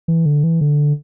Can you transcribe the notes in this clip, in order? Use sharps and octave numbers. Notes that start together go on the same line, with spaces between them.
E3
D3
E3
D3